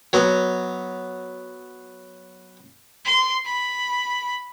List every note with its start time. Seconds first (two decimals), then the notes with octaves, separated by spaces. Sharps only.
0.13 F#3 B3
3.05 C6
3.45 B5